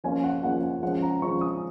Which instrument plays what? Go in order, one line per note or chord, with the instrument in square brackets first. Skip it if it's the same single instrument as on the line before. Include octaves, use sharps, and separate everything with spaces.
[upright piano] F3 A#3 C#4 F4 G#5
F#5
F3 A#3 C#4 F4 F#5
F#5
F3 G#3 C#4 F#5
A#5
F3 G#3 C#4 C#6
D#6